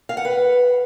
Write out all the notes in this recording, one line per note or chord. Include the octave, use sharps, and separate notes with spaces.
F5
F#5
B4